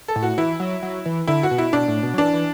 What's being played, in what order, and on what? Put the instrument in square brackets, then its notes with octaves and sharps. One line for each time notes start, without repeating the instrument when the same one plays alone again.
[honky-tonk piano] A4
[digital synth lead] A2
[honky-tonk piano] F#4
[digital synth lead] E3 [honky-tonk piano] E4
[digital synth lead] F#3
F#3
E3
[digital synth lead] D3 [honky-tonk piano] E4
[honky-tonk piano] F#4
[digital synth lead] B2
[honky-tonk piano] E4
[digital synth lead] B2 [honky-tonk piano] D4
[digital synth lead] A2
B2
F#3
[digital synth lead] E3 [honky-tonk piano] D4
[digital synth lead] E3